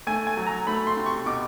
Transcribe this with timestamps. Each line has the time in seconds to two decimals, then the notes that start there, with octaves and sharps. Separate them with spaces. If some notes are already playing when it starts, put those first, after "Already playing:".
0.07 A3 G#5
0.27 G#5
0.37 F#3
0.47 A#5
0.67 A3 B5
0.87 C6
0.97 C3
1.06 C#6
1.26 B2 D6